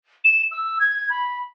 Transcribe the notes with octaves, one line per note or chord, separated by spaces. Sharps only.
E7
E6
G#6
B5